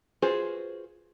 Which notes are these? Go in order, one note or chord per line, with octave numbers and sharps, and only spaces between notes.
F4 F#4 G#4 B4 C5